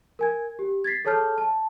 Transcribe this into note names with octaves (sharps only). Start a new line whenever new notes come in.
A#4 G#5 G#6
G4
G#6 A6 B6 C7
G#4 A4 C#5 A5 F6 G6
A5